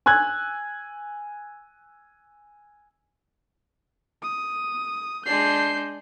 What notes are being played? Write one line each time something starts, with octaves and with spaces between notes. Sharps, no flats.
G#5 E6 F#6 G#6
D#6
G#3 D4 G6 C7